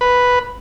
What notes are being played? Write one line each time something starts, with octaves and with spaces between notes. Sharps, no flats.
B4